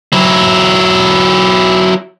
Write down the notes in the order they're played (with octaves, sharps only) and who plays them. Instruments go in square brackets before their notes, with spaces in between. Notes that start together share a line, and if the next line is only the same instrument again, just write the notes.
[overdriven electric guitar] F#3 E4